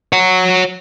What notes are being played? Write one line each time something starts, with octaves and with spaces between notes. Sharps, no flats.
C#5 F#5